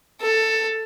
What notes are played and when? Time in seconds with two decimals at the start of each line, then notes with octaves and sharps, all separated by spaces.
0.21 A4